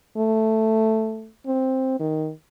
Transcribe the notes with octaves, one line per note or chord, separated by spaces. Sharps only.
A3
C4
D#3